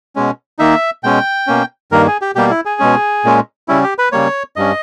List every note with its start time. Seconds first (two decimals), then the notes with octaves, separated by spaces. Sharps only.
0.16 B2 G#3 C#4
0.59 D#3 A#3 D#4 E5
1.04 B2 G#3 C#4 G5
1.47 B2 A#3 C#4
1.92 G2 D#3 A#3 A#4
2.07 G#4
2.21 G4
2.35 B2 G3 A#3 G4
2.50 E4
2.65 G#4
2.80 B2 G#3 C#4
3.25 A#2 G#3 C#4
3.68 C#3 G3 C#4 E4
3.83 G4
3.98 B4
4.12 C#3 G3 A#3 C#5
4.56 G2 G3 C#4 D#5